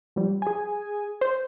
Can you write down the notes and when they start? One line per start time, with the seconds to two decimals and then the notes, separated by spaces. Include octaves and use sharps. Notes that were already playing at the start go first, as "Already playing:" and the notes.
0.16 F3 G3
0.42 G#4 G#5
1.21 C5